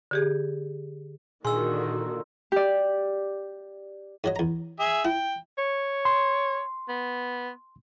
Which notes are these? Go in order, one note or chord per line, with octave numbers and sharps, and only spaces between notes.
D3 G4 G#4
A#2 D3 D#3 F#4 G#4 G#5 C6 E6
G4 D5
G#2 F#3 D#5
E2 A#5
G#4 E5
E4 G5
C#5
C6
B3